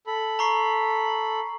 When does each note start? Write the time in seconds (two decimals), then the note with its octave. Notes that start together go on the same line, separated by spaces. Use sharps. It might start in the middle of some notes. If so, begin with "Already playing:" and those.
0.07 A4 B5
0.39 A#5 C#6 C7